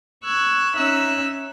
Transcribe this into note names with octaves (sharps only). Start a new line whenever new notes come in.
C#6 E6 F#6 G#6
C#4 D#4 E5 E6 F#6